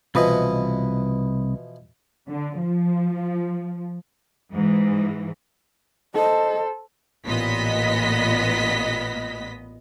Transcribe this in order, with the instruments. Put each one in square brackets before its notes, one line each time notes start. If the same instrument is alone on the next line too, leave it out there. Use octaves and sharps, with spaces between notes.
[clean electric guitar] C2 B4 D#5 [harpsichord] B2 E3 F3
[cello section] D3
F3
[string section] G#2 E3
[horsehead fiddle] A4 C5 [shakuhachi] D#5
[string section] A1 A#2 B3 D#5 B6